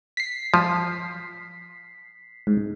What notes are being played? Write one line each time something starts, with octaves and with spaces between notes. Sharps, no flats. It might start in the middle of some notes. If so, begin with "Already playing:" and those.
B6 C7
F3
G#2